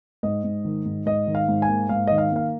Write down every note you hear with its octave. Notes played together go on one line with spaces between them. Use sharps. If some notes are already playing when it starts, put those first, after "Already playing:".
G#2 D#5
G#2
D#3
G#2
G#2 D#5
D#3
F5
G#2
G#5
A#3
G#2 F5
D#3 D#5
F5
A#3 F5